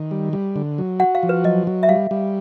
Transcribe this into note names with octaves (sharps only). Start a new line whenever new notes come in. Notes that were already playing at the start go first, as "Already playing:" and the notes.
Already playing: D#3
G3
G3
D3
F#3
F#4 F#5
F5
F3
B4
F#3 D#5
F#3
E5
G3 F5
G3